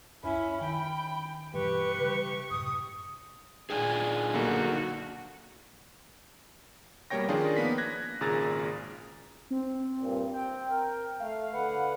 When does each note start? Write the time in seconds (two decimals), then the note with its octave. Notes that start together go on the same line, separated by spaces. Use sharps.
0.23 C#2 F#2 C#4 E4 B5
0.61 D#3 G5
1.54 G2 B2 E3 G4 B4 C#6
2.00 C#3 G3
2.51 F#2 A2 C3 D#6
3.70 A#2 D4 D#4 G#4 G#5
4.33 B1 D3 A#3 F#4
7.10 B2 G3 A#3 C#5 G5 A#6
7.29 D#3 F3 C#4 D4 F4 G#4
7.57 A#3 B3 B6
7.78 F#6 G#6 A#6
8.21 G#1 A#2 C#3 G#4 A#5 A6
9.50 C4
9.98 G2 A#2
10.33 C4 G5
10.70 A#4
11.20 A3 F5
11.54 D3 B4 F#5